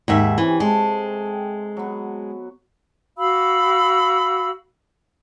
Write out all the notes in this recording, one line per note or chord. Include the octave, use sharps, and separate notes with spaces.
D#2 G#2 E5
C3 E3 C#4
G#3 A4 A5 C6
G5
F#3 B3
F#4 F5 B5 E6